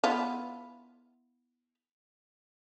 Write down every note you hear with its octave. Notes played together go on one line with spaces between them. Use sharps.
B3 E4 F4